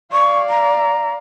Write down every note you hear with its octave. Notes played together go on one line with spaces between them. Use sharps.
D5 F5 C#6
A#5